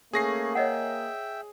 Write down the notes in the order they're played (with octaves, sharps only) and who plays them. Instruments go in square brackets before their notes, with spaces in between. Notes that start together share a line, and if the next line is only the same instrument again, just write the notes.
[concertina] A3 C#4 [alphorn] A#3 [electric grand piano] G#4 A#6 C7
[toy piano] C#5 D#5 F#5 [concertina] E5 G5